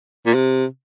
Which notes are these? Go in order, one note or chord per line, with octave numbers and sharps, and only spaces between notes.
A#2
C3